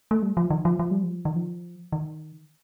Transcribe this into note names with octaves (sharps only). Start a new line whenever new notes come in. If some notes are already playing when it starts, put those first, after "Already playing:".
A3
G3
F3
D#3
F3
F3
G3
F3
D#3
F3
D#3